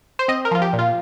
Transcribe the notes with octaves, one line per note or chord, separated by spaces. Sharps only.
C5
C4 D#5
A#4
F3 F4
G4
A#2
F4